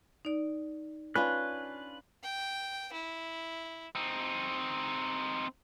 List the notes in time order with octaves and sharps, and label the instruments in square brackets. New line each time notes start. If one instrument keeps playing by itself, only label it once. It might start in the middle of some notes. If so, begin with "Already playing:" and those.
[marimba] D#4 D5
[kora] C#4 D4 [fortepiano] F4 B4 [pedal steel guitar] F#6
[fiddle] G5
E4
[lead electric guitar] C4 D#4